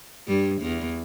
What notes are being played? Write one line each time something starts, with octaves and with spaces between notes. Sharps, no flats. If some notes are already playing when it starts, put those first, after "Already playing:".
G2 G3
E2 E3